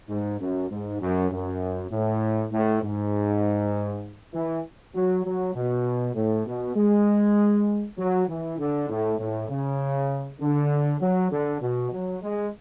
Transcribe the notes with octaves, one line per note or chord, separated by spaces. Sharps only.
G#2
F#2
G#2
F#2
F#2
A2
A2
G#2
E3
F#3
F#3
B2
A2
B2
G#3
F#3
E3
D3
A2
A2
C#3
D3
F#3
D3
B2
F#3
G#3